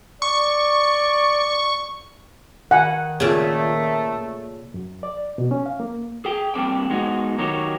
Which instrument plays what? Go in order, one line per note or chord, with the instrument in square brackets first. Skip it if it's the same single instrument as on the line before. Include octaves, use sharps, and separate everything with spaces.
[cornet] D5 [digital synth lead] C#6
[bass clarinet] D#3 [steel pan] F#5 G#5
[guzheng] A#2 C#3 [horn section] A3
[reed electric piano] F#2
D5
B2
C#4
F5
A#3
[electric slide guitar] G#4 G5
G3 A#3 C4 D4 G5
G#3 B3 D#4 F#4
D#3 F#3 D#4 G4 A#4 C#5